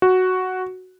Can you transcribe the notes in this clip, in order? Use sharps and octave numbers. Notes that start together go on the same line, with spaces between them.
F#4